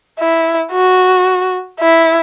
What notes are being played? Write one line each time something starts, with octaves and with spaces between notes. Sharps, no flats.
E4
F#4
E4